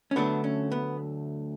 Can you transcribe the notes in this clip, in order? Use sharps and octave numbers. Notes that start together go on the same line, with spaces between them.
C#4
D2 D3 F#3 A3 B3 D4
C#4
B3